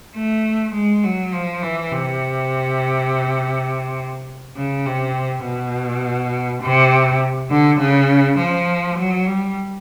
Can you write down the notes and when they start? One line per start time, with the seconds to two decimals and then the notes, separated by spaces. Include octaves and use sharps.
0.16 A3
0.74 G#3
1.04 F#3
1.33 F3
1.62 E3
1.92 C3
4.56 C#3
4.86 C3
5.44 B2
6.62 C3
7.51 D3
7.79 C#3
8.38 F3
8.98 F#3
9.27 G3